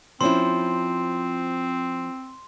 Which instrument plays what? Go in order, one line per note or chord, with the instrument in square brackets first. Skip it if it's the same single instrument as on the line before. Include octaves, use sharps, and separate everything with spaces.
[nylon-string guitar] F3 C#4 E4 [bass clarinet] C4 [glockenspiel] C6